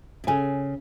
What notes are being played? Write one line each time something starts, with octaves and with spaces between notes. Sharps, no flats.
B2
C#3 A4 C#5 G#5